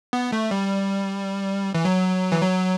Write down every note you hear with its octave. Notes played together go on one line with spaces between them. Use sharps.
B3
A3
G3
E3
F#3
E3
F#3